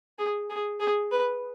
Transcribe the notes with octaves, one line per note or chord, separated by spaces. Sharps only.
G#4
G#4
G#4
B4